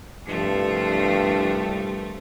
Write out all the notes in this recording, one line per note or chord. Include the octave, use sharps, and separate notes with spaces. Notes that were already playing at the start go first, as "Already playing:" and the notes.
C2 G2 F3 A3